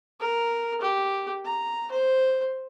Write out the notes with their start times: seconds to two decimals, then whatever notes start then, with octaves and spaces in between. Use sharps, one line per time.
0.20 A#4
0.81 G4
1.44 A#5
1.91 C5